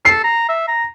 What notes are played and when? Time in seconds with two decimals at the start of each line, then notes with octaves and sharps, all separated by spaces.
0.05 A4 C7
0.24 A#5
0.49 E5
0.68 A#5